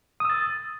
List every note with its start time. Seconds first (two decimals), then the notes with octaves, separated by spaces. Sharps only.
0.20 D#6
0.25 E6
0.30 A6